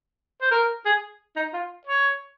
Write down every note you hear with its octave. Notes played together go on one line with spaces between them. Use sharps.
C5
A#4
G#4
D#4
F4
C#5